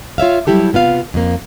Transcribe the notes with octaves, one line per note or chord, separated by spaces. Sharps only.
F4 C#5 E5 F5
F#3 G3 E4 G4 A4
C3 B3 F4 F5
F2 A#3